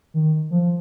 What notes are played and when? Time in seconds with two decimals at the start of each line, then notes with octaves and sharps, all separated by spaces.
0.14 D#3
0.51 F3